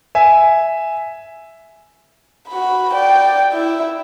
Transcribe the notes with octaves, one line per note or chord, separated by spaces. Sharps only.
E5 G#5
F#4 B5
D5 G5
E4 E5